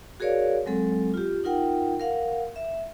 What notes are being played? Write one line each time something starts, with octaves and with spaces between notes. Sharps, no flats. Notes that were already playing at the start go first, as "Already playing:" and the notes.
F#4 G#4 A#4 C#5 D5 F5
F#3 G#3 C4 A4
F4 G4
D#4 F4 A#4 F#5 G5
A#4 F5 F#5
E5